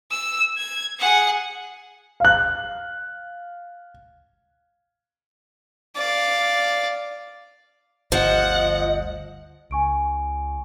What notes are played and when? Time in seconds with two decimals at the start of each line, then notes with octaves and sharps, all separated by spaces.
0.11 E6
0.58 G#6
1.00 G#4 F#5
2.20 F5 F#6
5.96 D5 F5
8.12 G1 D2 F3 D#5 F#5
9.71 C#2 G#5 C#6 D7